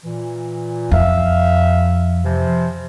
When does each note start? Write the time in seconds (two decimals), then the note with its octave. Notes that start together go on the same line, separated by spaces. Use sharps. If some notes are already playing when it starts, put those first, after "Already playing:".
0.04 A#2 E3
0.91 F2 E5 F5
2.24 C3 E3 F3